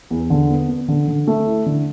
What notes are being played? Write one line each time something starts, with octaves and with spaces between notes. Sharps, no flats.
E2
D3
B3
B3
D3
D3
A3
E4
D3